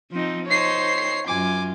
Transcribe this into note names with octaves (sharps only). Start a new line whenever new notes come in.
F3 C4 D#4
D#4 C5 C#5 C7
F#2 F4 G#5 D6